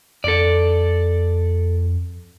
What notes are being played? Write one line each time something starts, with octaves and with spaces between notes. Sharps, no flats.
F2 A4 D5